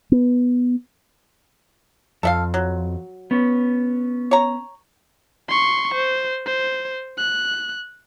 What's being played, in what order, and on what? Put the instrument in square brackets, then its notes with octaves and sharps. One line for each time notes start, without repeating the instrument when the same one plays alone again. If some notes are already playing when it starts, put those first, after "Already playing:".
[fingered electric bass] B3
[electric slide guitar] F2 [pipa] A4 E5 F5
[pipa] F#3
[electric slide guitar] B3 C#4
[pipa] C#5 A#5
[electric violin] C6 C#6
C5
C5
F#6